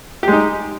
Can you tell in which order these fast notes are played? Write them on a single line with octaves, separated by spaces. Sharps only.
G4 G#3 D#4